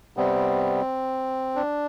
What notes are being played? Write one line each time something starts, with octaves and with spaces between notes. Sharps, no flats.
C3 G3 B3 C4
D4